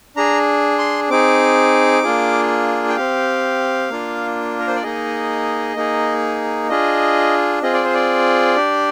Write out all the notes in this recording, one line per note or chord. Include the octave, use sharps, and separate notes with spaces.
D4 G#4 A#5
C6
C4 D#4 G#4 D6
A#3 D4 F4 G#4
G5
C4 G4 F5
A#3 D4 F4
A#4
C5
D5
A#3 D#4 G#4 D#5
A#3 D#4 G#4
D4 F4 G#4 D#5
C4 F4 G#4 D#5
D5
C5
D5
D4 G4